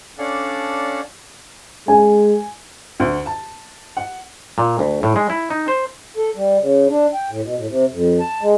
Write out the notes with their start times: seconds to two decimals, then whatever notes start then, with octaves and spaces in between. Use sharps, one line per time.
0.18 C#4 D4 A4 D5 F5 F#5
1.88 G#3 G#5
3.00 D2
3.26 A5
3.97 F#5
4.58 A#2
4.79 D2
5.03 A2
5.16 G#3
5.30 E4
5.50 D#4
5.68 C5
6.17 A4
6.36 G3
6.60 C#3
6.89 D4
7.14 G5
7.30 A2
7.42 B2
7.57 A2
7.68 C3
7.90 F2
8.20 A5
8.42 G#3